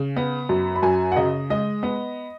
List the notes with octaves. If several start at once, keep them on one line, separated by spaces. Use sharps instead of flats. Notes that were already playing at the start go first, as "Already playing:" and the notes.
Already playing: C#3
B3
F#2
B5
F#2 G#5
F#5
C#3 D#5
G#3 D#5
B3